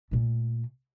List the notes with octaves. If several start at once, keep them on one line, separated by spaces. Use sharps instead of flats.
A#2 A3